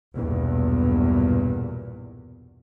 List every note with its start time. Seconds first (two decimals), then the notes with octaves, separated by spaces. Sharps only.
0.16 B1 E2 G2 A#2